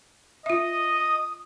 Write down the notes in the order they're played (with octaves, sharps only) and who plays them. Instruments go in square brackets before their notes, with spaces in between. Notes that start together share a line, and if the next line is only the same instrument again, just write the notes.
[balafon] F4 E5 [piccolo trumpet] D#5 [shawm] D#6